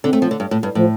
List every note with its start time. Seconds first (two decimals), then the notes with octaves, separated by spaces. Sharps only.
0.04 D3 C4
0.13 A3
0.22 F3
0.31 D3
0.40 G2
0.51 A2
0.63 G2
0.75 A2 F3